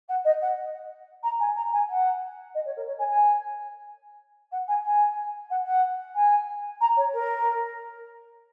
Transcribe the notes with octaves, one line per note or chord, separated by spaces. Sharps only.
F#5
D#5
F#5
A#5
G#5
A#5
G#5
F#5
D#5
C#5
A#4
C#5
G#5
G#5
F#5
G#5
G#5
F#5
F#5
G#5
A#5
C#5
A#4